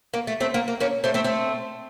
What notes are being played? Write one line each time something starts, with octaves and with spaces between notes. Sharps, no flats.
A#3
A3
A3 C4
A#3
A#3
A#3 C#4
A3 C4
A3 C4
A3 C4